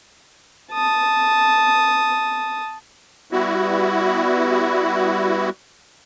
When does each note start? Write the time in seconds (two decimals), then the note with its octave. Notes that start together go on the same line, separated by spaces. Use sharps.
0.72 A5 D#6
3.32 G3 B3 E4 F#4